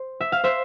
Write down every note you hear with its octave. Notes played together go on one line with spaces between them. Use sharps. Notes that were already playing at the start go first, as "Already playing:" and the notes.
Already playing: C5
E5
F5
C5 E5